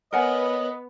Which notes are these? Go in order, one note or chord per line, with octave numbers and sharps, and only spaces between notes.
B3 A#4 C#5 D#5 F#5 G#5